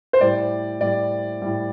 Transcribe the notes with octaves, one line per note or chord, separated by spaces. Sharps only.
C5
A2 G3 D5
A2 G3 D5
A2 G3